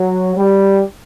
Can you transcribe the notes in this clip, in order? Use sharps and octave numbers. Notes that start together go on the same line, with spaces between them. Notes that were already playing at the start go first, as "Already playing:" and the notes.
Already playing: F#3
G3